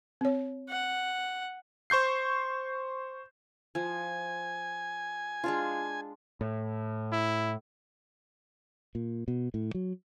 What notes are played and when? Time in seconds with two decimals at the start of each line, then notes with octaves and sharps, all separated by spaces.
0.21 C4 C#5
0.70 F#5
1.90 C5 C#6 G6 C7
3.75 F3 G#5
5.44 G#3 D4 F4
6.41 A2
7.12 E4
8.95 A#2
9.28 B2
9.54 A2
9.75 F#3